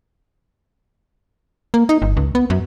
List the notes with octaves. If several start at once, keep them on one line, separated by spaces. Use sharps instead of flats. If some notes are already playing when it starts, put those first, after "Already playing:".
A#3
D#4
G1
C#2
B3
F#2